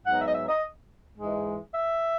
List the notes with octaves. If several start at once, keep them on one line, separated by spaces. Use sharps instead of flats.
G#2 F#3 B3 D#4 F#5
E5
D#5
E5
D#5
G#2 E3 G#3
E5